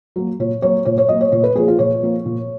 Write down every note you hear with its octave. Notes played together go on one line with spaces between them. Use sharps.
F#3 A#3
A#2 C#5
F#3 A#3 C#5
A#2 C#5
C#5
F#3 A#3 D#5
C#5
A#2 C#5
B4
F3 A#3 G#4
F4
A#2 C#5
F3 A#3
A#2